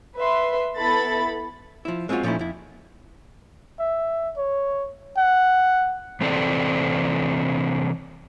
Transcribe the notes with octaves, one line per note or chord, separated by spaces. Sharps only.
B4 E5 C6
B3 E4 A4 B5 A6
F3 E4
G#3 C4 C#4 D#4 F4 F#4
A#2 F3 A3 C#4 D#4 E4
F2 E4
E5
C#5
F#5
C3 E3 C4 A4 C5 D5